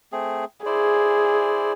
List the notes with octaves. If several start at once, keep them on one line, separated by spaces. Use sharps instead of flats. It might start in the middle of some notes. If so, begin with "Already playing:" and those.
A3 C4 G#4
E4 G#4 C5 D5